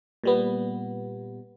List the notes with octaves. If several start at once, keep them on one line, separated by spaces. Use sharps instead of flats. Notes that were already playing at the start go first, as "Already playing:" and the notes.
A#2 G3 B3